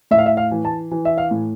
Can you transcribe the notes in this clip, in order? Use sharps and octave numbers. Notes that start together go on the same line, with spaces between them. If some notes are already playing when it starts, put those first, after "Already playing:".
A2 E5
F5
E5
F5
E3
A5
E3
E5
F5
A2